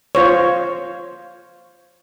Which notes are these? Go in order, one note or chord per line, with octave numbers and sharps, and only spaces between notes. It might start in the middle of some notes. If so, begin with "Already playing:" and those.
F4 C5 C#5